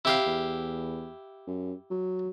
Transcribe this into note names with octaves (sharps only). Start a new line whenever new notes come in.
C3 E4 G4 F5
E2
F#2
F#3